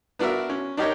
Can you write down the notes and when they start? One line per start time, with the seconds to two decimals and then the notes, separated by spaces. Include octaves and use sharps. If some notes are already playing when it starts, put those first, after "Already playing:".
0.19 B3 D4 F#4 A#4 E5
0.50 C#4
0.77 D4 D#4 G4 A#4 C#5